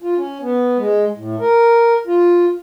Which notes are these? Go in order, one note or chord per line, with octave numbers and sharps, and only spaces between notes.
F4
C#4
B3
G#3
A2
A#4
F4